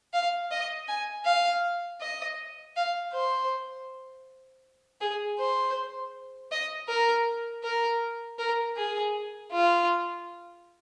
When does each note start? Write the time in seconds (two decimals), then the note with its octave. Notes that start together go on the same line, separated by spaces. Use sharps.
0.13 F5
0.51 D#5
0.88 G#5
1.25 F5
2.01 D#5
2.76 F5
3.13 C5
5.01 G#4
5.39 C5
6.52 D#5
6.89 A#4
7.64 A#4
8.38 A#4
8.77 G#4
9.52 F4